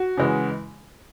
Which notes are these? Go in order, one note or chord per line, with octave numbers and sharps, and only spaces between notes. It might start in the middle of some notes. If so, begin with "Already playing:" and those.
Already playing: F#4
C#3 E3 G#3